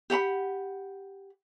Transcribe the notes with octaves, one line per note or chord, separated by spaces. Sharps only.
G4 F#5 A#5 B5